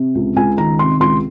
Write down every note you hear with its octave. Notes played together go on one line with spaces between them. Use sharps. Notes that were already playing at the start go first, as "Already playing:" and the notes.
Already playing: C3
C#2
C#2 G#5
D#3 A#5
C3 C6
C#2 C6